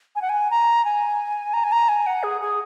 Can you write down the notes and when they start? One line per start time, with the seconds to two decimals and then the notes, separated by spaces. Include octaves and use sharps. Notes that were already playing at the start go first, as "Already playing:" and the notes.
0.16 G#5
0.22 F#5
0.29 G#5
0.51 A#5
0.85 G#5
1.54 A#5
1.64 G#5
1.72 A#5
1.89 G#5
2.07 F#5
2.23 G#4
2.41 G#4